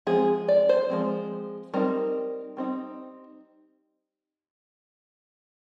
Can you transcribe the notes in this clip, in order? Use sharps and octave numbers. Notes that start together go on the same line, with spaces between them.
F3 G#3 C4 G#4
D5
C5
F3 G#3 C4
G3 C4 D#4 A#4
G3 C4 D#4